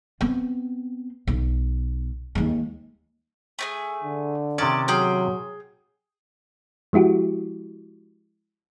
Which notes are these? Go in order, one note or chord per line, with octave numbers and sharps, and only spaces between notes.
B3 C4
B1
D#2 G#3
A3 F#4 G#4
D3
C3 D#3 C#4 D5 A5 C#6
F#3 G#4 G5 F6
F3 G#3 E4 F#4 G4